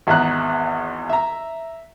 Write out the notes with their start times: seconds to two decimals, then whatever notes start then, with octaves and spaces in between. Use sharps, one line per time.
0.07 G#1 E2 E3 E5 A#5 F#6
1.10 E5 A#5